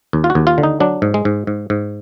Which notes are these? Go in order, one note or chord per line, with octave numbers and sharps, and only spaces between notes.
D#2
F4
F#4
D#2
F4
D3
D#4
F#3 D4
G#2
G#3
G#2
G#2
G#2